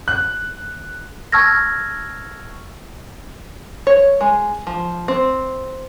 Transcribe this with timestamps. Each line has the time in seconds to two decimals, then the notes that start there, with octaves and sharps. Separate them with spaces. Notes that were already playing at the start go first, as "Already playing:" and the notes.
0.08 F#6
1.32 A5 C#6 E6 F6 G#6 A#6
3.87 C#5
4.21 G#3
4.67 F3
5.08 C4